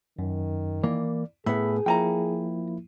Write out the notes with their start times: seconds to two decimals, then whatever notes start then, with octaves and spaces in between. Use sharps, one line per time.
0.19 F#2 D#3
0.83 E3 A#3 D5
1.46 A2 B3 G#4 E5 B5
1.86 F3 A#3 E4 G5 G#5 A#5